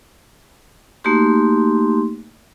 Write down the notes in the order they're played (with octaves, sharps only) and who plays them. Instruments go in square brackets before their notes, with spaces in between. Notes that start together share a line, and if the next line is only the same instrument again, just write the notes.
[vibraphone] A3 A#3 D#4 F#4 G4 C6